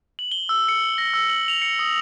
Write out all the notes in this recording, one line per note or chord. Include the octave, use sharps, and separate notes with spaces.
F#7
G7
E6
C#7
A#6
E6
F#7
F7
C#7
D#6